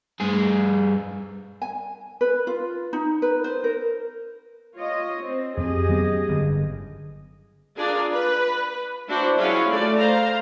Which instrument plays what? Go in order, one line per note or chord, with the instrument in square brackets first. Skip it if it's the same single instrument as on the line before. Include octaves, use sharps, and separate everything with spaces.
[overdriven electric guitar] G2 G#4
[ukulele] G#5
B4
F4
D#4
B4
C5
A#4
[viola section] F4 C#5 D#5
C4
[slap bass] F2 C4 [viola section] G4 G#4 D#5
[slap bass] F#3 B3 C#4
G1 D3
[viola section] D4 F4 G#4 A#4 D5
B4
D4 E4 F#4 C5
F#3 C#4 E4 F4 G#4 F5
A3 D5
C5 F5 A#5